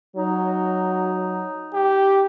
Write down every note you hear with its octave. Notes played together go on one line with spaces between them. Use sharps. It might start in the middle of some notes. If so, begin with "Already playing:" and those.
F#3 D#4
G4